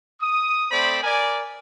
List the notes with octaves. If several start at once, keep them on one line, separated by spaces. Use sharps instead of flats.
D#6
A3 C4 C5 D5 B5
A#4 D5 G#5